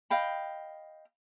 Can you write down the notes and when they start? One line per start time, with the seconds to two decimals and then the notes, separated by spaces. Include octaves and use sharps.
0.10 D#5 F5 G5 B5